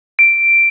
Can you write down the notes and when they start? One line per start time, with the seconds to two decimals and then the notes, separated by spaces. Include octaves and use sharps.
0.19 D7